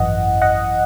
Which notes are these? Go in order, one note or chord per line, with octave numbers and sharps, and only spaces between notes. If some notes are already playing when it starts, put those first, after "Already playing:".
Already playing: G#1 F#2 E3 D#5 F#5
D#5 F#5